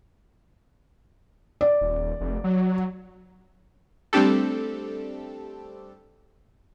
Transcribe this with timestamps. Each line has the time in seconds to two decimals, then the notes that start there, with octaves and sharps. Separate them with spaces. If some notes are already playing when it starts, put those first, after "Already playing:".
1.61 D5
1.81 D#1
2.20 F1
2.44 F#3
4.13 G3 A3 C4 D4 G4 A4